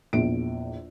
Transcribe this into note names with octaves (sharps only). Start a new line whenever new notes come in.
A#1 E2 D7